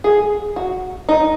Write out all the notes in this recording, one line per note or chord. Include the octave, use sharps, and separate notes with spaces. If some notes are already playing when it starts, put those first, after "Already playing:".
G#4
F#4
D#4